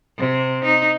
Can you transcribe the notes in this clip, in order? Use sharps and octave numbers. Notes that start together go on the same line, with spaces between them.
C3
D#4